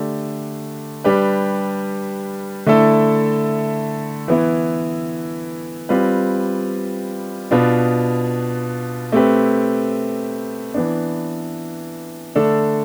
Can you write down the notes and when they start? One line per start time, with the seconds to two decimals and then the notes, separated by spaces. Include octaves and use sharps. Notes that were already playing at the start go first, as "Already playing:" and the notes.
Already playing: D3 A3 D4 G4
1.04 G3 D4 G4 B4
2.66 D3 A3 E4 A4
4.28 E3 B3 E4
5.89 G3 C4 F4 B4
7.51 B2 B3 D4 F4
9.12 A3 C4 G4 B4
10.74 E3 B3 D4
12.35 D3 A3 D4 A4